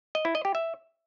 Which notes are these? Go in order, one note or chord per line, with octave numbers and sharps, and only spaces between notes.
D#5
E4
D#5
G4
E5